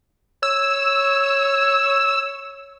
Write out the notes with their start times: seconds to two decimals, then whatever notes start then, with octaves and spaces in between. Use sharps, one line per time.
0.43 C#5 E6